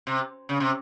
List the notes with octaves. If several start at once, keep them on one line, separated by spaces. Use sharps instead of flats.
C3
C#3
C3